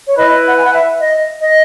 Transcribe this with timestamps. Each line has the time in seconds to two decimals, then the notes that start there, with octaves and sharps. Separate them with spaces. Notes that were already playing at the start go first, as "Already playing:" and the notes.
0.06 C#5
0.17 E4 B4 D#5
0.45 F#5
0.57 G#5
0.64 F#5
0.72 E5
1.00 D#5
1.40 D#5